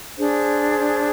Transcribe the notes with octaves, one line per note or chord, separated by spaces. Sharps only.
D4 G#4 C5